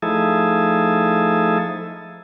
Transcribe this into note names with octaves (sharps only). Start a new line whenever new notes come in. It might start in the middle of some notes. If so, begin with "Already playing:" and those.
F3 A3 D#4 E4 G#4 A4